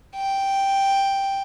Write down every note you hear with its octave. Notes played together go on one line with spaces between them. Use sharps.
G5